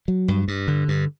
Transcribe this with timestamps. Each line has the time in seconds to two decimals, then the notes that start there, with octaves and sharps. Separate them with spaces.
0.08 F#3
0.28 G2
0.48 G2
0.68 D3
0.88 G2